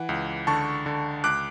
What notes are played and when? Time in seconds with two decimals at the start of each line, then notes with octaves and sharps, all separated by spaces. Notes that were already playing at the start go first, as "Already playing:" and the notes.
Already playing: E3 F#5
0.09 C#2
0.47 D3 A5 C#6
0.86 D3
1.24 C#2 D6 F#6